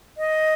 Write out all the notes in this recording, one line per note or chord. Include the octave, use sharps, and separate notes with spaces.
D#5